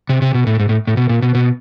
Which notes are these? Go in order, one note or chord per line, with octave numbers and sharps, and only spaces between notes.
C3
C3
B2
A2
G#2
A2
A2
B2
A#2
B2
B2